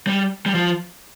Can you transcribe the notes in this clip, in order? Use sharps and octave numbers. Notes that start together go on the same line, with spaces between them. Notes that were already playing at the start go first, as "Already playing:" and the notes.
G3
G3
F3